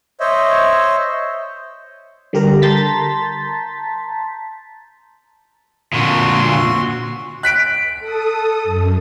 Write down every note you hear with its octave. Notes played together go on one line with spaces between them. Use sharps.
C5 C#5 D#5 E5
D3 G3 G4 A#4 A#5
A5 A#5 C6 G6 A6 B6
A#2 D3 F#4 C6
F#6 B6 D7
A4 D#6
F#2